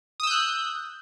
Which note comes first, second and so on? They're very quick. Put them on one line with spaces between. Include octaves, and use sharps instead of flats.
D#6 E6 G6 F#6